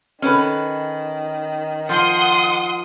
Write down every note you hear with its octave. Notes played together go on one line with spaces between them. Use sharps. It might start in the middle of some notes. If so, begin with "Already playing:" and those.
D#3 C#4 A4 B4
F3 F#5 C6 D#6